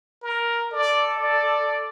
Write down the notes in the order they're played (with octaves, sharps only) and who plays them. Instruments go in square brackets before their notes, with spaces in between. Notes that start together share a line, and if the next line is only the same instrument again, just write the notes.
[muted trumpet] A#4
[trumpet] A4 [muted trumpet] D5
[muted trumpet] D5